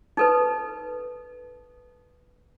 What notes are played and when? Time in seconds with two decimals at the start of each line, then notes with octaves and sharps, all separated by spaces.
0.17 D#4 A4 B4